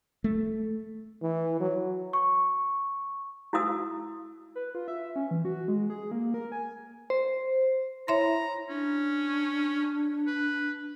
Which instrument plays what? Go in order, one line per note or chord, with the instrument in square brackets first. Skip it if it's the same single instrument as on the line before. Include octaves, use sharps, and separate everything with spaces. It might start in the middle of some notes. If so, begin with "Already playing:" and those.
[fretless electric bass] A3
[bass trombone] E3
F#3
[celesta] C#6
[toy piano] E4 F#4 F5 D#6 E6
[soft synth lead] B4
F4
E5
C#4
E3
F#4
G#3
G#4
A#3
A#4
G#5
[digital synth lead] C5
[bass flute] E4 [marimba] C#5 E5 C6 [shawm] A#5
[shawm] C#4 [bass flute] D4
[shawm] B4